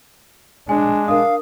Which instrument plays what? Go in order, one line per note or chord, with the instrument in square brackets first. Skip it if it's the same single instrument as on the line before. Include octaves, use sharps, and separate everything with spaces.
[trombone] G#3 [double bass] D4 [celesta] G#5
[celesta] A#4 D#6 [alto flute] F5